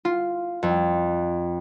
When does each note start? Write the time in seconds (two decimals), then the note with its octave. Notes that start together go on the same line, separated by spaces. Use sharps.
0.05 F4
0.63 F2